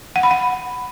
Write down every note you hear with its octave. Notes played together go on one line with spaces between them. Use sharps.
F#5
B5
F#5